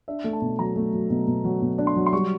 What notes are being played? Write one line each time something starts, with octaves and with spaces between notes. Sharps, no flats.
D4 E5
A3
A5
B2
F#3 A#5
A3
F#3
B2
B2
F#3
B2
D4
C6
F#3
C6
G3 C#6